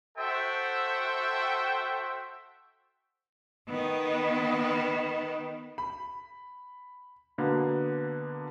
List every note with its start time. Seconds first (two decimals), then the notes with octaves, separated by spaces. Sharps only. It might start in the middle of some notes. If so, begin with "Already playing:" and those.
0.18 F#4 A4 C5 E5 G5
3.69 D#3 B3
5.78 B5
7.38 B2 D3 A#3 B3